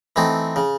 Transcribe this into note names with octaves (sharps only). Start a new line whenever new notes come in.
E3 A3 C4 D#4
C#3